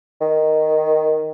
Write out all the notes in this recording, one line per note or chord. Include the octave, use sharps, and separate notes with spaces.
D#3